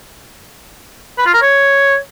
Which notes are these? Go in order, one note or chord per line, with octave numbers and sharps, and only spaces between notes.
B4
F4
A#4
C#5